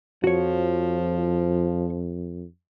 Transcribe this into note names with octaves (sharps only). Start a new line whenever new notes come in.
F2 F3 F#4 C#5